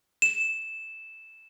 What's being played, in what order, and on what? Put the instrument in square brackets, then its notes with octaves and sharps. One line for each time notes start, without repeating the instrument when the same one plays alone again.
[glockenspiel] E7